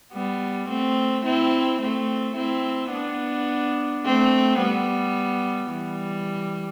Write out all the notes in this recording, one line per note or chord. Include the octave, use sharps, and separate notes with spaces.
G3 B3
A3 C4
C4 E4
A3 C4
C4 E4
B3 D4
A3 C4
G3 B3
E3 G3